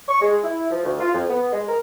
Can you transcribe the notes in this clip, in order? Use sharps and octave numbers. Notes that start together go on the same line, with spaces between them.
C#6
G#3
E4
F3
D2
F4
F2
B3
G#3
A#4